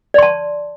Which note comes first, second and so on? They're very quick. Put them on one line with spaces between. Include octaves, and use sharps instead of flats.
D5 C6 A5